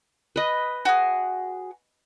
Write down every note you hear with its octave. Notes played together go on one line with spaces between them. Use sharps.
B4 D#5
F#4 G#4